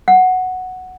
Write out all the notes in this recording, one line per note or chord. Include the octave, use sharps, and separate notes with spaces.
F#5